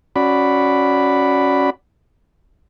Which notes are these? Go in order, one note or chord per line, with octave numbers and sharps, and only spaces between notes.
C#4 F#4 D5 B5